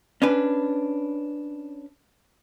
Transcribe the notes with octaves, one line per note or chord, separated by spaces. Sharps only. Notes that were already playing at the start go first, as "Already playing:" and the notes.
C#4 D4 B4